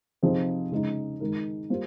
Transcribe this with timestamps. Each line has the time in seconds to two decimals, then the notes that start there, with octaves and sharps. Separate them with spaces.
0.23 C3 F3 C4 D#4 G#4
0.72 C#3 G#3 D#4
1.20 D#3 G#3 D#4 A#4
1.70 G3 A#3 F4 C5